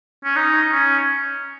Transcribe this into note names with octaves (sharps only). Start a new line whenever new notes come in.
C#4
D#4
C#4